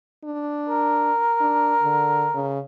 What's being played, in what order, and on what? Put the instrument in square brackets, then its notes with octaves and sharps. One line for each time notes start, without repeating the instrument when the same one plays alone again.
[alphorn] D4
[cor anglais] A#4
[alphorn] D4
D3
C#3